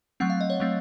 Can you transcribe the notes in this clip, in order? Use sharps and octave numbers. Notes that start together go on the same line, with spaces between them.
F#3 A3 C4 F#5
F5
D#5
C#5
F#3 A3 C4